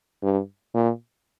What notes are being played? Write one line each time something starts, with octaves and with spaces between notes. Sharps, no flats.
G2
A#2